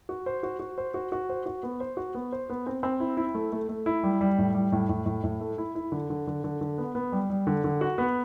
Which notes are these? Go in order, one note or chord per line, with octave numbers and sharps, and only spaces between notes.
F#4
C5
F#4
F#4
C5
F#4
F#4
C5
F#4
B3
C5
F#4
B3
C5
B3
C4
C4
E4
E4
A3
A3
A3
E4
G3
G3
A2
G3
A2
A2
A2
A2
A3
E4
E4
D3
D3
D3
D3
D3
B3
B3
G3
G3
D3
D3
F#4
B3